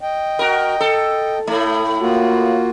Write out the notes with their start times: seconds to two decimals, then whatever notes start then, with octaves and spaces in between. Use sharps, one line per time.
0.01 D#5 G5
0.39 F#4 A#4
0.80 A4
1.47 A2 A3 E4
2.00 A#3 F4 F#4